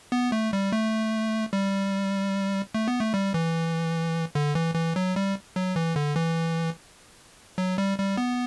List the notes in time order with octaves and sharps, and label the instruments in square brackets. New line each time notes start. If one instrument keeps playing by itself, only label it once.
[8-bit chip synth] B3
A3
G3
A3
G3
A3
B3
A3
G3
E3
D3
E3
E3
F#3
G3
F#3
E3
D3
E3
F#3
G3
G3
B3